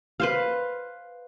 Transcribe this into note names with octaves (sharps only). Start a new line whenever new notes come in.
B4 C5 F5